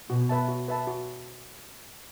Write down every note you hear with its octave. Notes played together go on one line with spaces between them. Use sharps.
B2 F#4
B4 E5 A5
F#4
B4 E5 A5
F#4